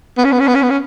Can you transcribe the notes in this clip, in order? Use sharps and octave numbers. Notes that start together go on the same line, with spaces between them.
B3
C#4
B3
C#4
B3
C#4
B3
C#4